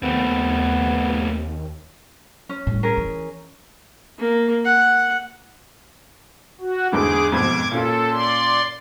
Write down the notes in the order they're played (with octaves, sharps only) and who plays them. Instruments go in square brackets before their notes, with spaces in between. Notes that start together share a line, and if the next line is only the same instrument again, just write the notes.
[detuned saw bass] D#2 [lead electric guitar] A3 C4 [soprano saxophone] B3
[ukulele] C#4
[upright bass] A2 G3
[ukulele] C#4 G#4 A#4
[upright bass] E3
[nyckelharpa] A#3
F#5
[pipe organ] F#4
[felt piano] E2 G#2 D3 [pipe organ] G#4 D6
[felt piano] F2 G#2 B2 [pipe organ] D6 G#6
[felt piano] A#2 C#4 F4 [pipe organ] A4
[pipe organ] D5 C6